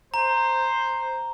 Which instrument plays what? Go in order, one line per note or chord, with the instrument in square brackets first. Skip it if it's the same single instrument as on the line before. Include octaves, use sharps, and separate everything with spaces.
[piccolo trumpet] C5 [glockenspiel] A#5